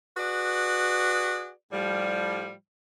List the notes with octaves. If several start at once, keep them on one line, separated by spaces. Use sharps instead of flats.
F#4 G#4 B4 D5
A2 F3 G3